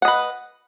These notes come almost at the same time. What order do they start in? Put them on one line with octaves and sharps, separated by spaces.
F#5 D#5 B4